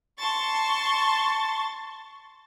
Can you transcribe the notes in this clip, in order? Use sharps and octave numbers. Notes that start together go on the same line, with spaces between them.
A5 C6 C#6 A6